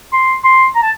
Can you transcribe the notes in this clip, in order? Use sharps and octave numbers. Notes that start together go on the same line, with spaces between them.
C6
C6
A#5
A5